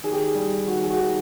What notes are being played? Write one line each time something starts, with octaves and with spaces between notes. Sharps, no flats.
D#3 G#4
G4
G#4
G3
D#3 F#4
G#4
F#4
D#3 G4